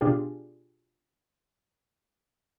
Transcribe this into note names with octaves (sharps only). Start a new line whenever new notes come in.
B2 D4 F4 G4 G#4